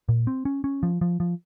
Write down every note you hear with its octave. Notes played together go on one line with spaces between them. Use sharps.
A#2
C4
C#4
C#4
F3
F3
F3